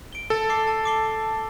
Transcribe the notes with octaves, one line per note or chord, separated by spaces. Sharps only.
D7 G7
A4 A5
D6 C7 G7
A5
D6 C7 G7